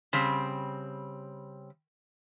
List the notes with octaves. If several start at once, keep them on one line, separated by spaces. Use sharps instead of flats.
C#3 G3 C4